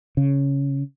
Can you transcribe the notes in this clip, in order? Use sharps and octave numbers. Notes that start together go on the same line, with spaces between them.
C#3